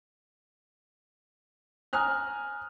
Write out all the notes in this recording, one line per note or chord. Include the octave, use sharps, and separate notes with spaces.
G#5 A#5 D#6 F6 F#6